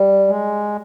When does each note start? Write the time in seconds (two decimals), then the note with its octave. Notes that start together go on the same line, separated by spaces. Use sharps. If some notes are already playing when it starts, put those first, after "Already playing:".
Already playing: G3
0.28 G#3